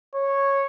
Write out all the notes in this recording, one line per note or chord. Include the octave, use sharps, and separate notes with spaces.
C#5